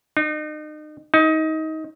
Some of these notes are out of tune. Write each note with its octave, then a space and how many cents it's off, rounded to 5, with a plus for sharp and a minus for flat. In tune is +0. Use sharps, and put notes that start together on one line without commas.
D#4 -35
D#4 +25